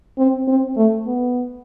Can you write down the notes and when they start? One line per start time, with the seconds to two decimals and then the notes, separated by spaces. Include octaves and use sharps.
0.18 C4
0.48 C4
0.77 A3
1.07 B3